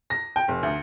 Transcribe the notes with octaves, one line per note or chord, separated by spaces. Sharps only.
A#6
G5
F1
D2